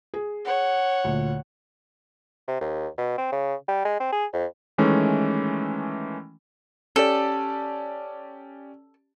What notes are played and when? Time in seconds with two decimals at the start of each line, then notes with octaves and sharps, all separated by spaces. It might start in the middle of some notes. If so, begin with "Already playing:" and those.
0.14 G#4
0.45 C#5 F#5
1.04 D2 A#2
2.48 C3
2.61 D#2
2.98 B2
3.18 C4
3.32 C#3
3.68 G3
3.85 G#3
4.00 C4
4.12 G#4
4.33 F2
4.78 D#3 E3 G#3 A3 C#4
6.96 C#4 G4 A4 D5